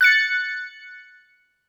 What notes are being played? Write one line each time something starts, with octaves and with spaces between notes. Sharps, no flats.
F#6 A6 C#7